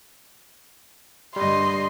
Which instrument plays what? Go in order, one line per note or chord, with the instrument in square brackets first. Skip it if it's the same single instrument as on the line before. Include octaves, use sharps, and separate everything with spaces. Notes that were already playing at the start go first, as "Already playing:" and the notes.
[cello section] G2 D3 D#5 [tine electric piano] G3 [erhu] C6